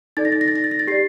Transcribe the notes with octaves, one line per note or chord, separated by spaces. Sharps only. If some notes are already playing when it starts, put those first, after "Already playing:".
D#4 A4 D5 A6
A#6
A6
A#6
A6
A#6
A6
A#6
A6
G4 D5 C7